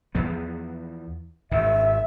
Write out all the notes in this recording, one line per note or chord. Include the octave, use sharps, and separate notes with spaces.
E2 F3 B3
G#1 F#2 D#3 E5